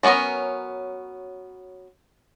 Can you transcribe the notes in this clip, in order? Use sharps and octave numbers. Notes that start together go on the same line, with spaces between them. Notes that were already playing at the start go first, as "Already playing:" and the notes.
F#3 A3 B3 C#4 A#4